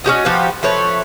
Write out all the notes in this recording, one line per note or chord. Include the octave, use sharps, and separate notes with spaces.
C#4 F#4 G4 D#5
F3 F#4 G4 B4
F3 A3 B4 C#5